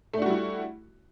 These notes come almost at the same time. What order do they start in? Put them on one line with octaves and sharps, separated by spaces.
A3 D4 F#4 G3 E4